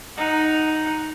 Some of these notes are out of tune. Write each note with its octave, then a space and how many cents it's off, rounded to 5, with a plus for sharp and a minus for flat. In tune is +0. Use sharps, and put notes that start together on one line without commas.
D#4 +0 F#5 +0